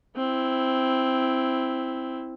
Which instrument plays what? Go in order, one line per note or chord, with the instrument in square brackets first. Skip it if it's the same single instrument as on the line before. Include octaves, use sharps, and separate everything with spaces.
[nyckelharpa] C4 E4